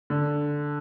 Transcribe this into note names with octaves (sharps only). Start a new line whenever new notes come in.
D3